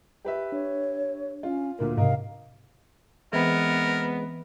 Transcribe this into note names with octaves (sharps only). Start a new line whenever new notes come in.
G4 B4 E5
D4 C#5
C#4 F4
D2 A#2 A#3 A#4
G#2 C3 A#4 D#5 F5
E3 G#3 B3 C4 A#4 B4